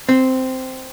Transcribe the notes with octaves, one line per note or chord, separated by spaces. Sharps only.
C4